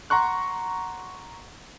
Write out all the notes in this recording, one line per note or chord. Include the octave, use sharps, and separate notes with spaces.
F#5 A#5 C6 C#6 F#6